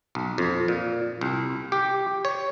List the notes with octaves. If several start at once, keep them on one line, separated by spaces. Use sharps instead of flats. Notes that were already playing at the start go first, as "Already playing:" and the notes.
B1
F2
A#2
C2
G4
C#5